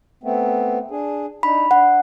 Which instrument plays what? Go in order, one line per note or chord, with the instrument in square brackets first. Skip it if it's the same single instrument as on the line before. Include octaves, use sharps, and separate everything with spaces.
[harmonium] A3 B3 C4
D4 G#4
[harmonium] D4 D#4 [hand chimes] B5
[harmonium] D4 [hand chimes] F#5